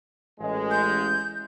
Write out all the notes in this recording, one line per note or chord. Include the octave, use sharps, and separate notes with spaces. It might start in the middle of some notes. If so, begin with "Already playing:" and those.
A1 G#3
G6